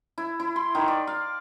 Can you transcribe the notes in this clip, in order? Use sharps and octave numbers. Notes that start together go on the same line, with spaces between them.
E4
E4
C6
D#3
D5
F5